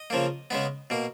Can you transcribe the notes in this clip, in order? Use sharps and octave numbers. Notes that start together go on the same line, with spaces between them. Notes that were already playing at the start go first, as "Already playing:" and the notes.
Already playing: D#5
C#3 F3 A#3
C#3 G#3 B3
B2 A#3